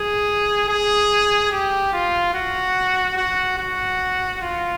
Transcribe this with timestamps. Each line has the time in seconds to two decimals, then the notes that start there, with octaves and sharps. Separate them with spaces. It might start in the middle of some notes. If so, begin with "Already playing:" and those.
Already playing: G#4
0.69 G#4
1.51 G4
1.93 F4
2.34 F#4
3.17 F#4
3.58 F#4
4.41 F4